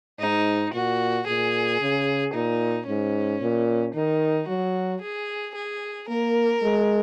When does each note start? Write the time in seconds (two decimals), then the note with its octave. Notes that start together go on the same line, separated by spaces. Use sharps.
0.19 G#2 D#4
0.73 A#2 F#4
1.27 A#2 G#4
1.81 C#3
2.34 A#2 D#4
2.87 G#2 C#4
3.41 A#2
3.94 D#3 D#4
4.48 F#3 F#4
5.02 G#4
5.55 G#4
6.09 A#3 A#4
6.62 G#3